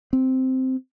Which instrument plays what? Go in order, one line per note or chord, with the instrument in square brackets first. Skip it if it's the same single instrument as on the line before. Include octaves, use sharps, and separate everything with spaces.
[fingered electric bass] C4